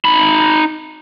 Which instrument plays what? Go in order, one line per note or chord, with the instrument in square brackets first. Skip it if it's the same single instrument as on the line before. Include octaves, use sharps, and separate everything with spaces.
[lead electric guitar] D#4 B5